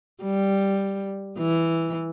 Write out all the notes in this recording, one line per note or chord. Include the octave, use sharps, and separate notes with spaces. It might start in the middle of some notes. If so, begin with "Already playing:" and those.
G3
E3